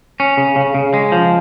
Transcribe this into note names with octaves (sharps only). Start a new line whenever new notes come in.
C#4
C#3
C#3
C#3
G#3
F3